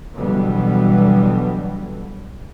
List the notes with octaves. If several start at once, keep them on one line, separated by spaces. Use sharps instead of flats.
B2 D3 E3 F#3 G3 B3